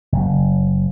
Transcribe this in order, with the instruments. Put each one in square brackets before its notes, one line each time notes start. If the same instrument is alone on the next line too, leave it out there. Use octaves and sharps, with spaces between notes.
[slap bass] F#1